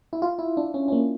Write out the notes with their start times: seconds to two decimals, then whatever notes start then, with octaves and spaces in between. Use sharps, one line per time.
0.13 E4
0.22 F4
0.39 E4
0.57 D4
0.74 C#4
0.88 C#4
0.92 A#3